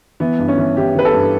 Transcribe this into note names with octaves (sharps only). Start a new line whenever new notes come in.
E3 B3
G2
C#4
E3
E3 G4
E3 B4
A4
G2